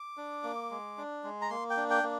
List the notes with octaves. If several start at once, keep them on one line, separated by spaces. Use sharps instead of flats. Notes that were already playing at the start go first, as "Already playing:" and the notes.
Already playing: D6
D4
A#3
G#3
D4
G#3
A#5
A#3 C6
G5
D4
G5
A#3